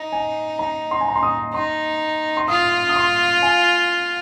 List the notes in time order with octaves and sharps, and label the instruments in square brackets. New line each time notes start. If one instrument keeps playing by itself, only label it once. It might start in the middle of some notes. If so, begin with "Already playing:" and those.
Already playing: [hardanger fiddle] D#4 [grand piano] D#5
[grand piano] G#5
A#5
C6
G#5
A#5
C6
D#6
[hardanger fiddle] D#4 [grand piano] C6
[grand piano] C6
[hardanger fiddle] F4 [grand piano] D#6
[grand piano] D#6
C6
G#5